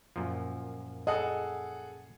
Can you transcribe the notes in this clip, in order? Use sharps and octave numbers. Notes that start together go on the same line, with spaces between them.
F#2 A#2 F3
G#4 A4 D#5 F#5